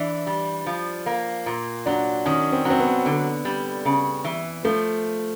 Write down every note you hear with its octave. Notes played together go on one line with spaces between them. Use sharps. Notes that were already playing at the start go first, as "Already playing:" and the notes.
Already playing: E3 D4
G3
F3
A#3
A#2
F#3 D4
D#3 C#4
C4
F#3
C4
B3
D3
G3
C#3
E3
F3 A3